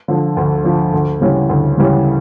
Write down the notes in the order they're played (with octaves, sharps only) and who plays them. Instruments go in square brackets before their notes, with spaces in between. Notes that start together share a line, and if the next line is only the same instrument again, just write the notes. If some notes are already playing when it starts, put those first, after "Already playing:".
[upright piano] D3 F3
D2
D3 F3
D2
C#3 E3 G3 C#4
D2
C#3 E3 G3 C#4